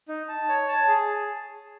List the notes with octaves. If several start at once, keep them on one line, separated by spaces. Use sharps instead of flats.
D#4
A5
C#5
A5
G#4